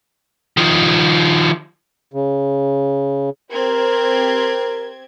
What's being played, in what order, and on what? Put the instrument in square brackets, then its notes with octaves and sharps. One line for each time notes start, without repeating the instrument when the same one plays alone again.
[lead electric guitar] D#3 F3
[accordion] C#3
[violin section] C4 G4 G#6 [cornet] A#4